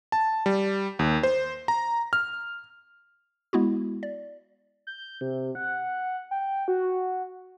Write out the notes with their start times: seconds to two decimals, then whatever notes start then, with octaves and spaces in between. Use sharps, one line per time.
0.12 A5
0.46 G3
0.99 D#2
1.23 C5
1.68 A#5
2.13 F6
3.53 G#3 B3 E4 F#4
4.03 D5
4.87 G6
5.21 C3
5.55 F#5
6.31 G5
6.68 F#4